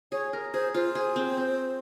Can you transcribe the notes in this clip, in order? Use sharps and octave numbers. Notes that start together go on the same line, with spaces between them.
G#4 C#5
A#4
G#4 C5
F4 C5
G#4
C4
C4